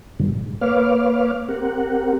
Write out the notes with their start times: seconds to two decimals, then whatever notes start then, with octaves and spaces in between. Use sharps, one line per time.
0.20 G2 B2 D3 D#3 F3 G3
0.34 G#2
0.61 A#3 B4 C#5 F5 D6 F6
1.48 C4 G4 A#4 F#5